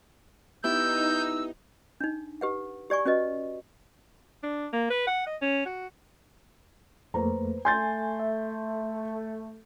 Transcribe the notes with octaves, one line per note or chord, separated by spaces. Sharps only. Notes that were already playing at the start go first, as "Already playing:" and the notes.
B3 D#4 E4 G4 E6 G6
D4 D#4
G4 B4 F#5
G4 D5 G#5 C#6
C#4 F#4 B4 D#5
D4
A#3
B4
F#5
D#5
C#4
F#4
F2 A3 A#3 B4 C5 A#5
A3 G#5 C6 G6 A6
E5